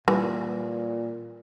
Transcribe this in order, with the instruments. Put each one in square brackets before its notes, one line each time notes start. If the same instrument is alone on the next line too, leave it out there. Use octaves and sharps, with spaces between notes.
[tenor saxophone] A#2 [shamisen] E3 [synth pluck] G3